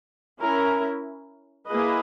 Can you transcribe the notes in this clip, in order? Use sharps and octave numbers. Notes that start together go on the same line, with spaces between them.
C#4 E4 A#4
A#3 E4 G#4 B4 D#5